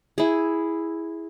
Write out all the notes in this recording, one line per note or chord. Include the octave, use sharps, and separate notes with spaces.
E4 G#4